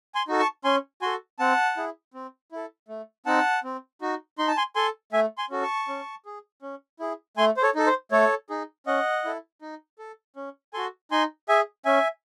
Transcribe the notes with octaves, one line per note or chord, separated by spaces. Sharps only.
G#5 C6
D#4 F#4 A4
A5 C#6
C#4 G#5 C6
F#4 A4 G#5 C6
C4 F#5 A5
E4 G#4
C4
E4 A4
A3
C4 D#4 F#5 A5
C4
D#4 F#4
D#4 C6
A5
G#5 C6
A4 G#5 C6
A3 E5 G#5
G#5 C6
C#4 F#4 A4
A5 C#6
C#4
G#4
C#4
E4 G#4
A3 G#5 C6
C5
A4 C#5
D#4 A4
C5
A3 A4 C#5
D#4 G#4
C#4 D#5 F#5
E4 A4
D#4
A4
C#4
F#4 A4 G#5 C6
D#4 G#5 C6
G#4 E5 G#5
C#4 E5 G#5